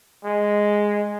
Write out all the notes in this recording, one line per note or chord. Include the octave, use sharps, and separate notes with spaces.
G#3